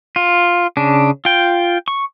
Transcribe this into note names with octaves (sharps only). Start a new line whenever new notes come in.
F4
C#3 D4
F4 G5
C#6